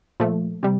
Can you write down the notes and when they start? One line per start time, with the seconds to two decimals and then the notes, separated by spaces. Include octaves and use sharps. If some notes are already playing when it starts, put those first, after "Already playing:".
0.20 A#2 F3 A3
0.63 C3 G3